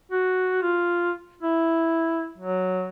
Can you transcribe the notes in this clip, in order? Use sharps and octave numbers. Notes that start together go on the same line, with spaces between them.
F#4
F4
E4
F#3